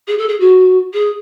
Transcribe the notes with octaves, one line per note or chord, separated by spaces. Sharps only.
G#4
A4
G#4
F#4
G#4